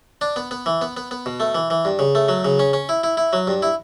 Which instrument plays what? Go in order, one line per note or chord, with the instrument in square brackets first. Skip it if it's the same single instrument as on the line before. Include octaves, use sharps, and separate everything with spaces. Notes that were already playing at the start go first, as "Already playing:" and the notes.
[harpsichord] D4
B3
B3
E3
B3
B3
B3
B2
A3
E3
E3
G2
C#3
A3
F#3
C#3
C#4
C#4
E4
E4
E4
F#3
G2
E4